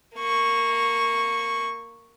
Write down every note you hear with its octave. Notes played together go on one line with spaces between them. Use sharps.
A#3 C#6